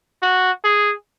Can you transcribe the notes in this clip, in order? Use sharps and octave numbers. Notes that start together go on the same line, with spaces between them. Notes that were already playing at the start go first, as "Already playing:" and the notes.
F#4
G#4